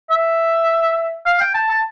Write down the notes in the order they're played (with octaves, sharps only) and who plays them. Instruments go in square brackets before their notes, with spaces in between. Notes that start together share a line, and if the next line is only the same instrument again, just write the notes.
[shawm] E5
F5
G5
A5
A5